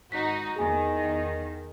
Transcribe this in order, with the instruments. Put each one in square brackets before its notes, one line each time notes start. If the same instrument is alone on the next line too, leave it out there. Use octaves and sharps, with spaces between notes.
[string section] G#1 D#4 F#4 [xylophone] B6
[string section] E2 D#3 [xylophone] G#4 G#5